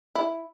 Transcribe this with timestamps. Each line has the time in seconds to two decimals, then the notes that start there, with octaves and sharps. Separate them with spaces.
0.15 E4